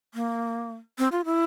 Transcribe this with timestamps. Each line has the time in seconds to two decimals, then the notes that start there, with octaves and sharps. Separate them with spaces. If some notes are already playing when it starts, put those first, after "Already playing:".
0.14 A#3
0.98 C4
1.12 F4
1.25 E4